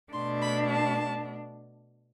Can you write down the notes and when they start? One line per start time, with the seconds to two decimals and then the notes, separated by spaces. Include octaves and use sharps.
0.13 B2 A3 D4 C6
0.42 B5
0.70 A5